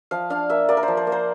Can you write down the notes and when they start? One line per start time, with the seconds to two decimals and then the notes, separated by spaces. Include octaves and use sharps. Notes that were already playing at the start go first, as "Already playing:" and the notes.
0.11 F3 F5
0.30 D4 F5
0.50 A#3 E5
0.69 A#3 D5
0.77 A#4
0.83 C5
0.88 F3
0.97 C5
1.07 A#3
1.12 C5